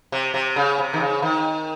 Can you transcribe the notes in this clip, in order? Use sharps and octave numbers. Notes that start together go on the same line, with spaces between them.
C3
C3
C#3
C3
D#3
C#3
D#3